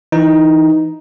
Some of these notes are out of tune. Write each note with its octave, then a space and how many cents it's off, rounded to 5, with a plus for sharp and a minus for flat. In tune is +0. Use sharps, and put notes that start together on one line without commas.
E3 +0 D#4 +5